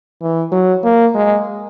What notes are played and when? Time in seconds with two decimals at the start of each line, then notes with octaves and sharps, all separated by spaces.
0.22 E3
0.52 F#3
0.84 A#3
1.15 G#3